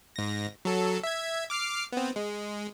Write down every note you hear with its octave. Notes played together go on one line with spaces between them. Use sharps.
G#2 A#6
F#3 A4
E5 G#6
D6 F6 C7
B3 C4
G#3